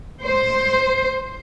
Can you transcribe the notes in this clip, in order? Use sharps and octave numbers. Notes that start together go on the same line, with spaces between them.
C5